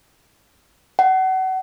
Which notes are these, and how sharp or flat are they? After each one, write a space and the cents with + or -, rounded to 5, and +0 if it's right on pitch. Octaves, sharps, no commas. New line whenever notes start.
F#5 +30